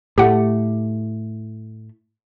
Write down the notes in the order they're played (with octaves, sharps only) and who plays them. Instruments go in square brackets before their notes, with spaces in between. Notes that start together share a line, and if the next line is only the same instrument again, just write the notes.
[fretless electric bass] A2 A3 [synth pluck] G4 F#5